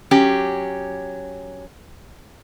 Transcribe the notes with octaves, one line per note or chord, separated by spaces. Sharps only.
F#3 C#4 G4